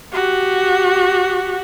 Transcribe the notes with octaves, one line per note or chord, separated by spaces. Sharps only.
F#4 G4